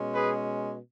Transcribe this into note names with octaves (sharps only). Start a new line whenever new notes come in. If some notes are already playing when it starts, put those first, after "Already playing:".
Already playing: B2 G#3 C#4
G#4 B4